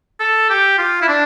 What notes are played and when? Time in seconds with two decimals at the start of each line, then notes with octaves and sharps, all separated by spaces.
0.20 A4
0.50 G4
0.78 F4
1.02 E4
1.08 D4